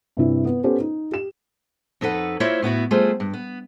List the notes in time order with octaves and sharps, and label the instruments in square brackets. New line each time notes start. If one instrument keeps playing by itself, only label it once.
[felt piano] G2 C3 E4
B3
B3 C#4 G4 A4 C5
D#4
G4 E7
[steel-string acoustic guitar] F2 D#4 A4 B4 F#5
A#3 E4 F4 C5 C#5 E5
A2 B3 E4 F#4
G3 A3 F4 G#4 C5
G2
B3